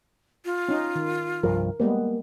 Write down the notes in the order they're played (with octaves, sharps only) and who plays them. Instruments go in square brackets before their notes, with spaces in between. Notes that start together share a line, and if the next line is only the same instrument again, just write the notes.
[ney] F4
[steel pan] C#4 D#4
D#3
[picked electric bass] C2 G2 F3 [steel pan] A#4
[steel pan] G3 G#3 B3 [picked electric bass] A#3